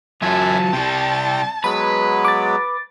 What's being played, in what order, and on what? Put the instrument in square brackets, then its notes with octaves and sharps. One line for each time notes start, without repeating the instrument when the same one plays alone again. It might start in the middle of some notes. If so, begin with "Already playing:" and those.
[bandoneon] F#2 E5 G#5 [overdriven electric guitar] F#3 F4 [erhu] A5
[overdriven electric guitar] C3 G3 [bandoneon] G5
[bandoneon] F#3 G#3 B3 [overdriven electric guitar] B4 [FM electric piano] B5
[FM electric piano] D6 A6